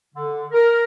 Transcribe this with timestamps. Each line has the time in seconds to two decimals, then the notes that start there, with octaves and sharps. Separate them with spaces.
0.15 D3
0.52 A#4